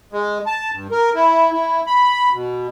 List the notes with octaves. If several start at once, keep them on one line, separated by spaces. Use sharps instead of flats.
G#3
A5
G2
A#4
E4
E4
B5
B2